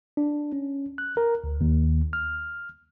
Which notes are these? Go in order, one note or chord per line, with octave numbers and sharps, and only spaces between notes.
D4
C#4
F#6
A#4
D2
D#2
F6